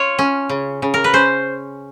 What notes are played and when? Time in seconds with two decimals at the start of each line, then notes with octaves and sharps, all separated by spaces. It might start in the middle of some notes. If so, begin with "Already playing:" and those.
Already playing: F4 C#5
0.19 C#4
0.49 C#3
0.82 C#3
0.94 A#4
1.04 B4
1.13 C#4 C5